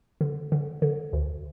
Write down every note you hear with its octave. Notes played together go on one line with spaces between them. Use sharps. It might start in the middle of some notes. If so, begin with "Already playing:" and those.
D3
D3
D3
D2